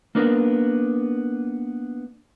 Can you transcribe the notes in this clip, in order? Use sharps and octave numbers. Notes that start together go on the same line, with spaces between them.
A#3 B3 D4 A#4